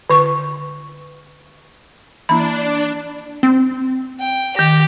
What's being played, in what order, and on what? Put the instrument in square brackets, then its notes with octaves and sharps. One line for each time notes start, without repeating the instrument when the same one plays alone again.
[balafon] D3 C#6
[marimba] E3 A#3 E4 [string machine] D4 [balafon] B5
[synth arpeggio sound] C4
[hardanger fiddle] G5
[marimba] D#3 A#6 [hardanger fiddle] G4